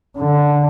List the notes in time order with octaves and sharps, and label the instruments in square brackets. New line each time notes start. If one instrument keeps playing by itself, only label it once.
[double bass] D3